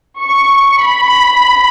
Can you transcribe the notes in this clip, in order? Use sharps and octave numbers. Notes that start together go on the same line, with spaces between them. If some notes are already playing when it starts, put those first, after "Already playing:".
C#6
B5